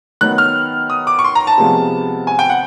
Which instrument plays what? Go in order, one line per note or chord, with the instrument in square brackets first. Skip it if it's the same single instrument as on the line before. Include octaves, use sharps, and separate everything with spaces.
[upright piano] D#3 F#3 B3 [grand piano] F#6
[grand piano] F6
D#6
D6
C#6
C6
A#5
A5
[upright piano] C3 F3 G#3 B3
[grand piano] G#5
G5
F#5